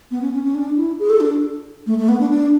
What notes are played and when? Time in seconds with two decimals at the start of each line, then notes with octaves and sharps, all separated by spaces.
0.11 B3
0.22 C#4
0.33 C#4
0.44 C#4
0.55 D4
0.77 E4
0.99 G#4
1.10 A4
1.20 D4
1.87 A3
1.98 A3
2.09 B3
2.20 D4
2.30 D4